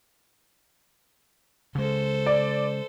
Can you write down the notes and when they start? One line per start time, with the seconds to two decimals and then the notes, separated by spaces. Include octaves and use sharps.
1.75 C#3 G#3 A4 C5
2.26 D5